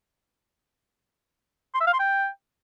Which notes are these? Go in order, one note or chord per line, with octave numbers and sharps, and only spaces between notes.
C6
E5
F5
C6
G5